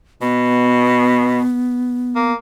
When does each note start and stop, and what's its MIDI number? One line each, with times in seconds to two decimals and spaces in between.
0.21 1.41 47
0.21 2.32 59
2.15 2.34 58